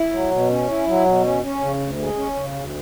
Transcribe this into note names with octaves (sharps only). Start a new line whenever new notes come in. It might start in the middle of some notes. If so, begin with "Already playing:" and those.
Already playing: E4
F#3
B2
C#4
E4
F#3
B2
C#4
C#4
C#3
D2
G#3
C#4
C#3
D2